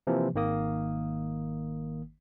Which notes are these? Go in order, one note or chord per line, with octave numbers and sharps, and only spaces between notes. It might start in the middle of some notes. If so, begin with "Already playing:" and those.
C3 E3 F3 A#3
G#1 D#3 A#3 D#6